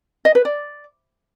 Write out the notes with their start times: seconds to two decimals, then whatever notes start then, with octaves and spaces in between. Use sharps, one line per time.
0.25 D#5
0.35 B4
0.45 D5